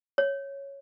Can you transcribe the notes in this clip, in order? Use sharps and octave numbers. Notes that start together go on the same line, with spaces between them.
C#5